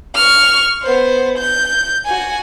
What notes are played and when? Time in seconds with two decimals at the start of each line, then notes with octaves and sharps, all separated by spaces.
0.15 C#6 F6
0.83 B3 C5
1.38 G6
2.06 F#4 G#5